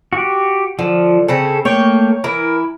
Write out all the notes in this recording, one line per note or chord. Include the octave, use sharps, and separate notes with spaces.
F#4 G4
D3 F3
C#3 C4 C#4 A4
A3 A#3 C#5 G5
E3 E4 A#4